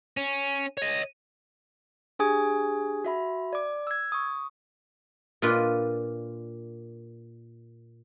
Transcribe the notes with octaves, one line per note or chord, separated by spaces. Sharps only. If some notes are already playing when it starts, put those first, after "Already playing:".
C#4
C#5 D#5
D4 G4 G#4 G#5 D#6 G#6
F#4 E5 B5
D5 D6
E6 G#6
C#6 D#6
A#2 D4 F4 B4 D#5